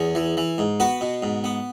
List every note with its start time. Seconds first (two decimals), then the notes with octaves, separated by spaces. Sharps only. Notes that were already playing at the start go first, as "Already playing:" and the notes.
Already playing: E2 G#4 C#5
0.15 E3
0.37 E3
0.58 G#2
0.80 B3 F#4 B4
1.01 B2
1.23 G#2
1.44 B3